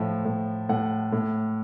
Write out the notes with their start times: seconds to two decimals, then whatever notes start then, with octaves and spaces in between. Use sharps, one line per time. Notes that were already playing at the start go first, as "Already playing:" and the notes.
Already playing: A2 F3
0.25 A2
0.69 A2 F#5
1.12 A2